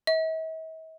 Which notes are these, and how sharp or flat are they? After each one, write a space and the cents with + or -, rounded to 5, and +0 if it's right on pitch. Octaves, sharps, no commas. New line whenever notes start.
E5 -45